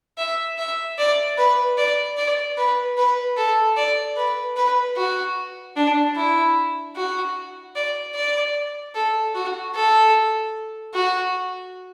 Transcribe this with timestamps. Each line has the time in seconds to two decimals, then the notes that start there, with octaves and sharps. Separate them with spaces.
0.18 E5
0.58 E5
0.98 D5
1.38 B4
1.78 D5
2.17 D5
2.57 B4
2.98 B4
3.37 A4
3.77 D5
4.17 B4
4.56 B4
4.96 F#4
5.76 D4
6.16 E4
6.96 F#4
7.76 D5
8.15 D5
8.95 A4
9.35 F#4
9.75 A4
10.94 F#4